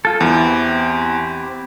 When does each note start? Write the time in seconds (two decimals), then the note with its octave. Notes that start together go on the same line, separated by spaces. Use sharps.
0.05 F4 A4
0.20 E2 C4 E4 G4